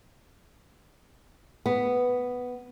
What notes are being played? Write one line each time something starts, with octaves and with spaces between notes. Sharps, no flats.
B3